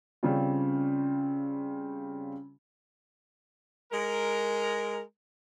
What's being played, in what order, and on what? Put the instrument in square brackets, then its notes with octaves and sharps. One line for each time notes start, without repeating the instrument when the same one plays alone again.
[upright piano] C#3 G3 C4 C#4 F4
[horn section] G#3 A#4